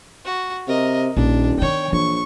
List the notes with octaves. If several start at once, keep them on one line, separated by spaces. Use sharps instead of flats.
F#4
C3 A#4 D#5
D#1 A#1 D4
D#3 B3 C#5 G5
A#1 E3 C#6